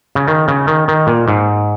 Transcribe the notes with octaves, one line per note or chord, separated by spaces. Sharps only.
C#3
D#3
C#3
D#3
D#3
A#2
G#2